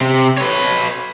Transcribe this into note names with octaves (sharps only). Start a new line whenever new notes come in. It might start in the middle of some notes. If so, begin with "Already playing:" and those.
C3
B4 C#5